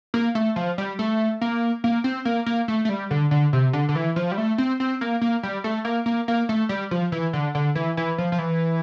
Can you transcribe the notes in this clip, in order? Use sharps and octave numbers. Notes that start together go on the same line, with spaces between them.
A#3
A3
F3
G3
A3
A#3
A#3
C4
A#3
A#3
A3
A3
G3
D3
D3
C3
D3
D3
E3
F3
G3
A3
C4
C4
A#3
A#3
G3
A3
A#3
A#3
A#3
A3
G3
F3
E3
D3
D3
E3
E3
F3
F3
E3